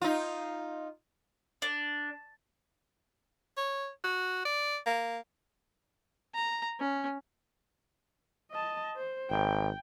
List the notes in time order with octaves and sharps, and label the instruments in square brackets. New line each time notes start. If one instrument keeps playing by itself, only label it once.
[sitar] D#4 F4
[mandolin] D4
[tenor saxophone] C#5
F#4
D5
A#3
[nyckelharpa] A#5
C#4
[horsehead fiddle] D#5 A5
C5
[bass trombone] G#1 [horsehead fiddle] G5